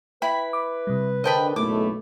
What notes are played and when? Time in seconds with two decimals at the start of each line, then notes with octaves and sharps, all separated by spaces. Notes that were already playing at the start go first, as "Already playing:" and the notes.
0.22 E4 B4 G5 B5
0.53 D6
0.87 C3 G3
1.24 D3 A#4 C5 D#5 G5 A5 B5
1.56 F#1 B1 A3 E4 D6